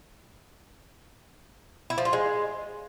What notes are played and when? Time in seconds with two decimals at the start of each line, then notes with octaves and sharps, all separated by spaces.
1.90 E4
1.98 F3
2.05 F4
2.13 G#3